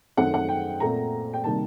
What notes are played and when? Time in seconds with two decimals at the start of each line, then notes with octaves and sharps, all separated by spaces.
0.17 F#2 D#3 A3 C4 F#5
0.34 F#5
0.49 G5
0.80 A#2 A3 C4 A#5
1.33 G5
1.44 C3 D#3 G3 A#3 A5